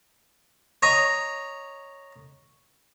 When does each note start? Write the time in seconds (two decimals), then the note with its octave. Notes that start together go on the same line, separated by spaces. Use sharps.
0.82 C#5 D#5 A#5